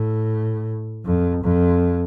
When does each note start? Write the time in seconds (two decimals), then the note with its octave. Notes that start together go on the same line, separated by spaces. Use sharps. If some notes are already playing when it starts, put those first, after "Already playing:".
Already playing: A2
1.05 F2
1.43 F2